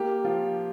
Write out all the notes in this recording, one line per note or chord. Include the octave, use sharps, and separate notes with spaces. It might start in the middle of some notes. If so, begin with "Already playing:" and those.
Already playing: A#3 G4
F3 F4